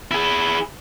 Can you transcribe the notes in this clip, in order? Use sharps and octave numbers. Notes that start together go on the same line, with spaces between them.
E4 G#4